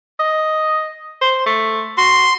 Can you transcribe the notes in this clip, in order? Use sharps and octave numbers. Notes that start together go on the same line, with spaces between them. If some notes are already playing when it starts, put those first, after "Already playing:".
D#5
C5
A3
F#4 C6